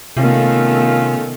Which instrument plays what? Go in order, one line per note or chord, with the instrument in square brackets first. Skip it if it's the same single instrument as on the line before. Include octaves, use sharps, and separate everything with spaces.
[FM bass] C3 [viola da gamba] D#3 B3 [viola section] A3 A4 [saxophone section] C#4 F4